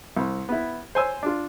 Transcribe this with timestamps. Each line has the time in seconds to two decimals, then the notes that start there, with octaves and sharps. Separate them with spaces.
0.17 C2
0.49 B3 E4
0.95 C5 C#5 G#5 C6 E6
1.23 D4 F4